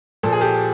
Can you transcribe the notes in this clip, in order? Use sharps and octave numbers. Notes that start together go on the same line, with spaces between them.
A#2 F3 A4
G#4
G4 A4